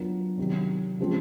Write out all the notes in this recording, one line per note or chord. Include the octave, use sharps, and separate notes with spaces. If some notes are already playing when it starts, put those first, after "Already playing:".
Already playing: F#3 B3 D4 F4 A#4
C3 D#3 F#3
C#3 F3 G#3 C4